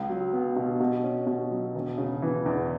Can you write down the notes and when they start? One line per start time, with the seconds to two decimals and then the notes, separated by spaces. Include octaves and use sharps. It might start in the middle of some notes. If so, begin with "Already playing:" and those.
Already playing: C#2
0.09 F#3
0.33 B3
0.56 B2
0.80 B2
1.04 C#4
1.27 B2
1.51 F#3
1.75 E1
1.98 C#3
2.22 E3
2.46 E2